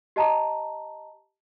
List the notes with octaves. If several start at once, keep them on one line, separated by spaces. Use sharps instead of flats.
G4 D#5 A5 A#5